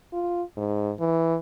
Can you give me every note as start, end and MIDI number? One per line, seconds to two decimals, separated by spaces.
0.12 0.43 65
0.57 0.92 44
0.99 1.37 52